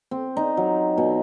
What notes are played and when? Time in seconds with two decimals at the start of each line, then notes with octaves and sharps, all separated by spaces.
0.11 C4
0.37 D#4
0.57 F#3
0.98 B2